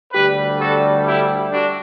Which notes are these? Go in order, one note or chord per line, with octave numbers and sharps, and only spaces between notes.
D2 D3 G3 G4 B4
F#4 A4
E4 G4
D4 F#4